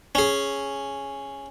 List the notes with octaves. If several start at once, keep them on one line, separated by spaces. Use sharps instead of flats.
C#4 G#4